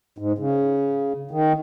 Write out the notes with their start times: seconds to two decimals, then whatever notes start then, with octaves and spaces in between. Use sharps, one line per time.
0.18 G#2
0.38 C#3
1.31 D#3